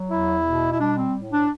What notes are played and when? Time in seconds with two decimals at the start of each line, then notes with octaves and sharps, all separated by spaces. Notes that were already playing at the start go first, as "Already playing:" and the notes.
Already playing: F#3
0.10 E2 E4
0.44 B2
0.71 E4
0.79 G3 D4
0.96 C4
1.14 A2
1.31 D4